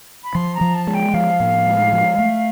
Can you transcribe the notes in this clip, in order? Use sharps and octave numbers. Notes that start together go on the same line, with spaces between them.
B5
F3 C6
A#5
F3
A5
G#3
G5
F3 F5
A2
G#3
F3
A3